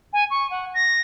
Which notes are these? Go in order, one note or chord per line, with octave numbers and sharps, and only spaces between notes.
G#5
C#6
F#5
A#6